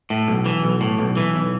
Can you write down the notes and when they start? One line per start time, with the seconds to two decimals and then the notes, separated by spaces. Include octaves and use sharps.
0.10 A2
0.28 B1
0.46 E3
0.64 B1
0.81 A2
0.99 B1
1.17 E3
1.34 B1